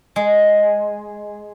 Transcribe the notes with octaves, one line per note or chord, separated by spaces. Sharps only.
G#3